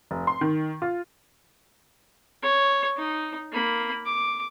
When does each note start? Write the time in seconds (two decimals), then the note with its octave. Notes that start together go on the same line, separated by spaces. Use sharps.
0.11 F1
0.27 C6
0.41 D#3
0.82 F4
2.43 C#5
2.96 D#4
3.52 A#3 B5
4.06 D6